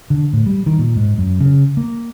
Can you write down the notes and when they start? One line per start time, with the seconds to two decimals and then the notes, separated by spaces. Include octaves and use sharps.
0.10 D3
0.33 A2
0.46 G3
0.66 D#3
0.79 A#2
0.96 G#2
1.18 F#2
1.40 C#3
1.77 A#3